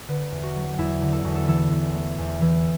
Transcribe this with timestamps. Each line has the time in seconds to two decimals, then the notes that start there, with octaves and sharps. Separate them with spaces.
0.08 D3 B4
0.32 E2
0.43 F#4
0.55 F#3
0.78 E2 E4
1.02 D3
1.13 A4
1.24 E2 F#4
1.35 A4
1.48 E3 A4
1.71 E2
1.94 A3
2.18 E2
2.41 E3